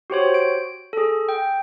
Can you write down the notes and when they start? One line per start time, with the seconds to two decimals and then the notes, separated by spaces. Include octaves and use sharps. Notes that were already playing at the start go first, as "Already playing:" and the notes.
0.10 F#4 G4 C5 C#5
0.34 D7
0.93 G#4 A4
1.29 G5